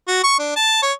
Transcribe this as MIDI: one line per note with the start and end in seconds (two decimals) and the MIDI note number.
0.08 0.21 66
0.24 0.37 85
0.39 0.52 62
0.56 0.82 81
0.82 0.93 73